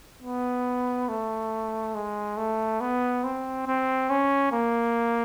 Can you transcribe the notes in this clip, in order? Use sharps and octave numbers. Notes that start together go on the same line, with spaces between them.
B3
A3
G#3
A3
B3
C4
C4
C#4
A#3